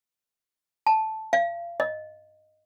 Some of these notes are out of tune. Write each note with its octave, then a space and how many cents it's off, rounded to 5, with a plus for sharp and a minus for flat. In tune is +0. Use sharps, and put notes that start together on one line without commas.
A5 -5
F5 -30
D#5 -5